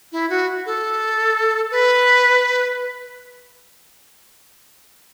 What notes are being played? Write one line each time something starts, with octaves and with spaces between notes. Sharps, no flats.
E4
F#4
A4
B4